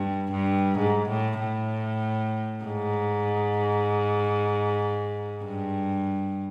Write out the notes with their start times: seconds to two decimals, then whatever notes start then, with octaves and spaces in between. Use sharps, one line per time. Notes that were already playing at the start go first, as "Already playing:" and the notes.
Already playing: G2
0.31 G2
0.78 G#2
1.09 A2
1.40 A2
2.65 G#2
5.44 G2